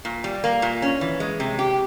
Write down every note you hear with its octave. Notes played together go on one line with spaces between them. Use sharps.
A#2
G3
A#3
A#2
C#4
E3
G#3
C3
G4